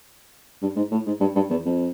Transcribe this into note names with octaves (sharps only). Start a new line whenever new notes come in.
G2
G#2
A2
G#2
G2
G2
E2
F2